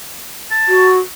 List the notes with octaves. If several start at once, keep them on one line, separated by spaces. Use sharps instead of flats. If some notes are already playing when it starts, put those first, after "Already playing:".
A5
F#4